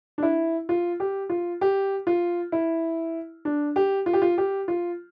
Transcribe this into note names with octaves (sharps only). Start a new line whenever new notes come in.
D4
E4
F4
G4
F4
G4
F4
E4
D4
G4
F4
G4
F4
G4
F4